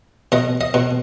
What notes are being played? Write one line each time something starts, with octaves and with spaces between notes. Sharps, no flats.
B2 D#5
D#5
B2